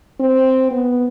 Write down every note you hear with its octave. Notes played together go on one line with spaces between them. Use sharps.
C4
B3